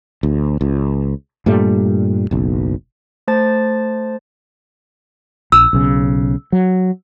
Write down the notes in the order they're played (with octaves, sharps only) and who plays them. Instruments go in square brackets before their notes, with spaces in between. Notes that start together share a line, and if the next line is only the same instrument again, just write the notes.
[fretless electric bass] D2
C#2
G2 A#2 G3 A3
F#1 B1
[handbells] A3 C5 A5 A6
[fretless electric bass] A#1 [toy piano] E6
[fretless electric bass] B1 C#3
F#3